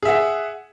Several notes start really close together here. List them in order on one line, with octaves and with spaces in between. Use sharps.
G#4 E5 F#5